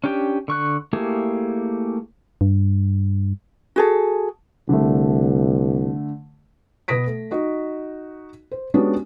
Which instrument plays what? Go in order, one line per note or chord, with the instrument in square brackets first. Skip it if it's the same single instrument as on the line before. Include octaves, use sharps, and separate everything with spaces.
[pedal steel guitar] C#4 D4 G4 G5
D3 C#6 F#6
A3 A#3 E4 G4 G#4
[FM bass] G2
[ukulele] F#4 G#4 A4
[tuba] C2 [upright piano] D3 A3
[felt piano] B2 B4 D#6 A#6 B6 D7
A3
D#4 F#4 D#5
C5
G#3 B3 C#4 D4 F#4 G4